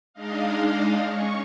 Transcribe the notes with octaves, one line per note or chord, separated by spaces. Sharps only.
G#3 D4 D#4 D#5 F5
C#4 C#6